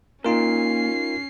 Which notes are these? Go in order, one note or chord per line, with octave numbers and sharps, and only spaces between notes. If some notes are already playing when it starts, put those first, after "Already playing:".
A#2 C#4 D#4 F4 A#4 C7